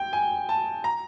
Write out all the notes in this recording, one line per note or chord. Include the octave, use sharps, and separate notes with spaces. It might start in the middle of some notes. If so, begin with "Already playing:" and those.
Already playing: G5
G#5
A5
A#5